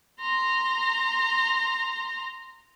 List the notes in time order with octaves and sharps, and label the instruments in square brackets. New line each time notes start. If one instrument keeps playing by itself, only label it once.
[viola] A#5 C6